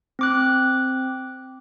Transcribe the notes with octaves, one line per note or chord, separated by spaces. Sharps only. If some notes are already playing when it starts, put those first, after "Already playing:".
C4 D6 F#6